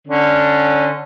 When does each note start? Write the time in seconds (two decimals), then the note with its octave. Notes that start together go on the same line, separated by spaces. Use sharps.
0.07 D3 C#4